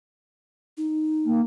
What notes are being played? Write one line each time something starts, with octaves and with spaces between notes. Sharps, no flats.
D#4
A#3